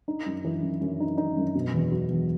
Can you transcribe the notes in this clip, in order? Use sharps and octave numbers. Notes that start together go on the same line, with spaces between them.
D#4
F#2
E3
F#2
F#2
D#4
D#4
F#2
B2
E2
F#3
E2